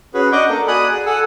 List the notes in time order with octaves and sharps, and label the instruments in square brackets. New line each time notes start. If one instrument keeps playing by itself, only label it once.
[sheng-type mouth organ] C#4 F#4 G#4 B4
D4 D#5 F#5 C#6 D6 G6
A#3 A4
F#4 D5 G#5 B5 D#6 F#6
G#4
A4 F#5 G#5 E6